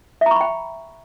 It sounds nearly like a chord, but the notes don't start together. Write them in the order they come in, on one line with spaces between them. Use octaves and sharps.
E5 A#5 C#6 B5 G5